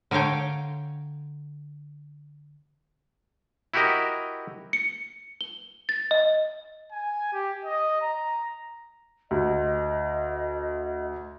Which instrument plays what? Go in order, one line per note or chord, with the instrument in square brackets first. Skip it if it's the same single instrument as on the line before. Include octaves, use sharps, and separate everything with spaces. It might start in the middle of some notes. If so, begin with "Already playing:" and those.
[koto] D3 A#4 C#5 F5 G5
[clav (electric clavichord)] E4 F#4 G4 A#4 D#5
[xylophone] C#7
G7
A6
D#5
[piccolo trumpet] G#5
G4
D#5
A#5
[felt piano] D2 [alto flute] D#5